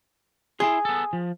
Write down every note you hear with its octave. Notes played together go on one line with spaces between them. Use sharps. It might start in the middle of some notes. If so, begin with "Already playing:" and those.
E4 G#4 C6
B3 A4
F3